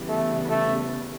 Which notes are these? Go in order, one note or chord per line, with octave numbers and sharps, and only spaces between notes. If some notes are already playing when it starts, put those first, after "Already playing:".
Already playing: C#3 E3 G3 B3
A3
A3